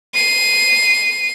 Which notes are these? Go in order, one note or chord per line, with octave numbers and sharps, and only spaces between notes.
C7 D#7